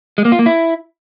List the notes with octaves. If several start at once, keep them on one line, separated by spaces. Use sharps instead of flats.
G#3
A#3
F4
A#3
E4